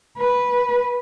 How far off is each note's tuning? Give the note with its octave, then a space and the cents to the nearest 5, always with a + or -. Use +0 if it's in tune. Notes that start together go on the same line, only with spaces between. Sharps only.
B4 -5